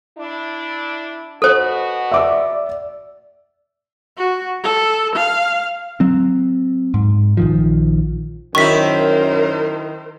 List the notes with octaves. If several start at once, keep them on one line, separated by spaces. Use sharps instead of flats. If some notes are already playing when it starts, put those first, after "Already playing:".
D4 E4
B2 B3 F#4 A4 C5
D5 E5 D6 E6
F#4
A4
F5
F#3 C4
G#2
A#1 D#3 F3
F#2 D#3 E4 A#4 C5 C#6 B6